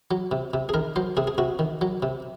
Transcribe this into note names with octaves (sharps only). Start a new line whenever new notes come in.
F#3
C3
C3
G#4
D#3 A#4
F#3 C5
C3 G#4
G#4
C3 F#4
D#3
F#3
C3